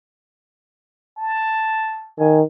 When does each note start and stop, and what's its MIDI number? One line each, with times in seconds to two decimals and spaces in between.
1.18 2.10 81
2.19 2.42 51
2.19 2.39 80